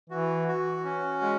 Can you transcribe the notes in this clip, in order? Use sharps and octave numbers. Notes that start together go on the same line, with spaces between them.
E3 F#4
F#4
C#4
G#3